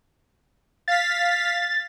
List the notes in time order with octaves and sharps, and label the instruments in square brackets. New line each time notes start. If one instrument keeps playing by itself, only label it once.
[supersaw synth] F5 B6 [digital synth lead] A6